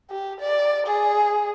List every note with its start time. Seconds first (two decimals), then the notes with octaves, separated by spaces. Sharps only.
0.10 G4
0.41 D5
0.87 G#4